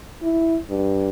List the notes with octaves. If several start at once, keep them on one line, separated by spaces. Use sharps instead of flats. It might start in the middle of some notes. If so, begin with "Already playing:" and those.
E4
G2